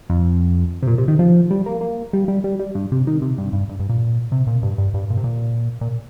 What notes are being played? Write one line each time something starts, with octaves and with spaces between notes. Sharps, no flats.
F2
C3
A#2
C3
D#3
F3
G3
A#3
A#3
G3
G3
G3
G3
G2
C3
D#3
C3
G2
G2
G2
G2
A#2
C3
A#2
G2
G2
G2
A#2
C3
A#2
A#2